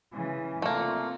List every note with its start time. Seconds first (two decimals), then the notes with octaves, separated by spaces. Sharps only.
0.13 C#3 E3
0.62 C3 A3 A#3 F4